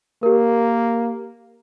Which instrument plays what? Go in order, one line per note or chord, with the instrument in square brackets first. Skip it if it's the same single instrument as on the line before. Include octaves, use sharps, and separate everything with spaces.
[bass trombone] A#3 [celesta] G4 A#4